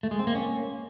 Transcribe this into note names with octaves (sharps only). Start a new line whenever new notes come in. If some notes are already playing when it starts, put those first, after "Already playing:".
A3
G#3
C4
A#3
C#4